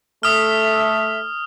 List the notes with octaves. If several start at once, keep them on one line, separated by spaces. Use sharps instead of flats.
A3 A4 E5 D#6 F6